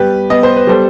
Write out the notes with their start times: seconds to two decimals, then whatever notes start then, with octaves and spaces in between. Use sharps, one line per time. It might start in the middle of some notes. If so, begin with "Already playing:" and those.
Already playing: G3 B3 G4 B4
0.30 B3 D#5
0.43 C5
0.56 B4
0.67 G3 A4 C5